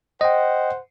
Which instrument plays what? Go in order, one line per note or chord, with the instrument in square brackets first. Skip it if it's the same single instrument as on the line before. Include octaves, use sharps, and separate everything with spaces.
[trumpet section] C5 F#5 [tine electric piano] D#5 G5